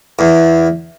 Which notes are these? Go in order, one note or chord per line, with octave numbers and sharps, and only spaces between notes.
E2